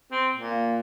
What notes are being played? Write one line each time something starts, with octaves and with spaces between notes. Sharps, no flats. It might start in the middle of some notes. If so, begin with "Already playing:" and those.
C4
A#2
A#3